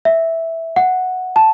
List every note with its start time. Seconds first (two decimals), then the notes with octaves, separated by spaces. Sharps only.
0.05 E5
0.76 F#5
1.36 A5